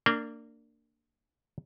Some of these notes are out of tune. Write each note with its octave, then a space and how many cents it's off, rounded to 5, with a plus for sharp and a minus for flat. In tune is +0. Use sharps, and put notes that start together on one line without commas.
A#3 -20 D4 +5